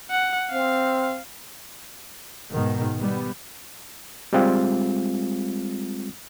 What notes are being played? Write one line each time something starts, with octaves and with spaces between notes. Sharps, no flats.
F#5
C4 F5
G#2 B2 D#3
G3 B3
G3 G#3 C4 F4